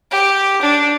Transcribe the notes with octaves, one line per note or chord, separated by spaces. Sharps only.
G4
D4